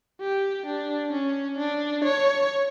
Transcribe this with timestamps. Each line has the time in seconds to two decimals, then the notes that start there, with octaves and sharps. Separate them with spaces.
0.21 G4
0.66 D4
1.12 C#4
1.58 D4
2.04 C#5